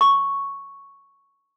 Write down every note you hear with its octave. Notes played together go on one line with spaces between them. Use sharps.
C#6